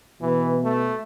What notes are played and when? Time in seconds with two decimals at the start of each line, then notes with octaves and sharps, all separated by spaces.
0.21 B2 E3
0.64 A3